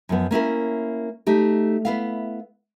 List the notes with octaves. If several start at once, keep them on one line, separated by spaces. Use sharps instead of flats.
F#2 F3 B3
A#3 C#4 E4 A#4
A3 D#4 G4
B3 E4 F5